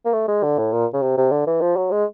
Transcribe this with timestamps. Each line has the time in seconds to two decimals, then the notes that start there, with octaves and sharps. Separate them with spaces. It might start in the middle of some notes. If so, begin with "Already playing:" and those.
0.05 A#3
0.13 A3
0.28 G#3
0.43 D3
0.58 A2
0.72 A#2
0.93 C#3
1.02 C3
1.17 C3
1.31 D3
1.47 E3
1.61 F3
1.76 F#3
1.91 G#3